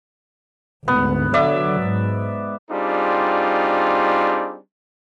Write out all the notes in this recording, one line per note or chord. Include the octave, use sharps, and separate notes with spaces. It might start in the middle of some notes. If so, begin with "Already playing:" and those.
G#1 D2 B3
D3 F#3 D5 E5
G#2
G3 C4 D4 D#4 F4 G#4